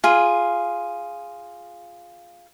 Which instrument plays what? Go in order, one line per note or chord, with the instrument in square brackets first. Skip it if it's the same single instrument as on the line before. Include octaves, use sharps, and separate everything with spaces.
[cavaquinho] F4 G#4